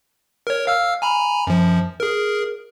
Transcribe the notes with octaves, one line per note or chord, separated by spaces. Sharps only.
A#4 C#5
F5 E6 F6
G#5 A#5 B5
F#2 F3
G#4 A#4